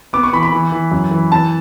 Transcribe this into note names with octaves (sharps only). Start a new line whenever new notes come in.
B3 D6
C#6
E3 B5
B5
E3
E3
F#2
E3
E3 A5